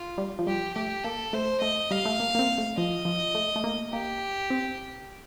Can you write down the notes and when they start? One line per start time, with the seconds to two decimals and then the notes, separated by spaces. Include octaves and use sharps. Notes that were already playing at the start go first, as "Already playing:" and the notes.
Already playing: F4
0.18 G3
0.39 F3
0.47 G3 G4
0.75 A3 G4
1.04 A#3 A4
1.33 A3 C5
1.61 A3 D#5
1.91 G3 F5
2.05 A3
2.20 A#3
2.35 A#3
2.39 C4
2.58 A3
2.77 F3 D#5
3.05 F3
3.35 A3
3.56 A3
3.64 A#3
3.93 A#3 G4
4.50 C4